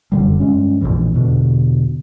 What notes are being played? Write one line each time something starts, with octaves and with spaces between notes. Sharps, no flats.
F1 F#2 D3 G3
G2 G#3 C#4
A#1 F2 A2 E3
E2 B2 D3